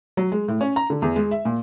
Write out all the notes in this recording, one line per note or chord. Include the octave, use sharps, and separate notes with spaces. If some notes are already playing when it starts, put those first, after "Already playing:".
F#3
G#3
A2
C#4
A#5
D3
E2
G#3
E5
A#2